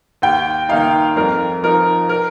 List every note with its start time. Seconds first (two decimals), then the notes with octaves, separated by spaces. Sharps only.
0.22 D#2 G5
0.69 D#3 A#3 D#4 F5
1.17 F2 A#4
1.63 F3 D#4 A#4
2.09 A#4